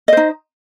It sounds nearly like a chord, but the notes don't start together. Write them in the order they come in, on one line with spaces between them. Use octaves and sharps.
D#5 C5 D#4